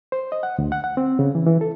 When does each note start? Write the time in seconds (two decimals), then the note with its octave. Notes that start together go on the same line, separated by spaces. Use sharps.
0.12 C5
0.32 D#5
0.43 F#5
0.58 D2
0.72 F#5
0.84 F#5
0.97 C4
1.19 C#3
1.35 E3
1.47 E3
1.61 A4